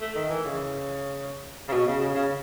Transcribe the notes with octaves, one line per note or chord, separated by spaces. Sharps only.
A3
D#3
E3
C#3
C#3
B2
C#3
C#3
C#3